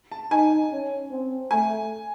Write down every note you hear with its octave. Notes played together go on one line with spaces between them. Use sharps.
A5
D#4 G#5
C#4
C4
A3 G#5